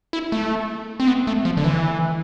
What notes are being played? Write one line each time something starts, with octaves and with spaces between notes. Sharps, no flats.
E4
A3
C4
B3
A3
F3
D3
E3